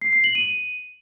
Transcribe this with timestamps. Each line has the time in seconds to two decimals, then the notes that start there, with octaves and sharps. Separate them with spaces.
0.01 C7
0.13 C7
0.24 F#7
0.35 D#7